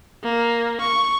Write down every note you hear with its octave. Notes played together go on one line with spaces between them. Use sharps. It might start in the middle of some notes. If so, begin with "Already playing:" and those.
A#3
C#6